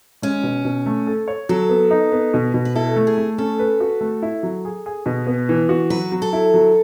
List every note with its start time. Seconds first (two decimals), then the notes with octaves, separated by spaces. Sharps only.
0.22 G#3 C#4
0.43 B2
0.65 B2
0.86 A3
1.07 A4
1.28 C#5
1.49 F#3 A4
1.69 B3
1.90 D#4
2.12 B3
2.34 B2
2.54 B2
2.65 B4
2.75 E4 A4
2.96 A3
3.07 G#4
3.18 A3
3.38 C#4 A4
3.59 B4
3.80 F#4
4.01 A3
4.22 E4
4.43 F#3
4.65 G#4
4.86 G#4
5.06 B2
5.27 B3
5.49 E3
5.69 F#4
5.90 F#3 B4
6.12 F#3
6.22 A4
6.33 E4
6.54 F#3